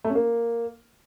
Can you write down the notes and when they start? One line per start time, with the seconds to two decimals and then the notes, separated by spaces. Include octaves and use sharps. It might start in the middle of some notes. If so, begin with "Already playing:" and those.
0.04 A3
0.10 C#4
0.15 A#3